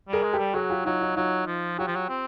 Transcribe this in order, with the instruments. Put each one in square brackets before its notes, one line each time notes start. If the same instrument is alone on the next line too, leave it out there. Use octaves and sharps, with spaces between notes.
[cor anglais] G3 [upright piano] G#4 A#4
[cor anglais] G#3
[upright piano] G4 A4
[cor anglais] G3
[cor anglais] F#3 [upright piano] F#4 G#4
[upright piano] F4 G4
[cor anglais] F#3 [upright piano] D#4 F4
[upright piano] D#4 F4
[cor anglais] F#3 [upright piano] D#4 F4
[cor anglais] F3
[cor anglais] F#3 [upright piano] F4 G4
[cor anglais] F3
F#3
C4